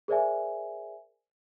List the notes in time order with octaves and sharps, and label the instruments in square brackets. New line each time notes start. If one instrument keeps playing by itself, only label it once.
[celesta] G#4 A#4 C5 D5 E5 G#5